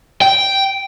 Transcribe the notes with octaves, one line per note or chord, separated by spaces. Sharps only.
G5